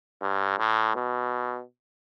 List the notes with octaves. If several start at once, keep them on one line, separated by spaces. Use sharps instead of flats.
G2
A2
B2